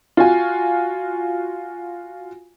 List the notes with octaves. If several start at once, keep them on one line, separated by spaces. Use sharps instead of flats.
F4 F#4 G#5